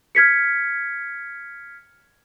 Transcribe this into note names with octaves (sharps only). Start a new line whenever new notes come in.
F6 G#6 B6 C#7